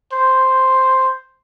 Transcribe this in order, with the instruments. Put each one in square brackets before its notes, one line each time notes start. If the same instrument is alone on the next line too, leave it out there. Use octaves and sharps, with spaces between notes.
[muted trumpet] C5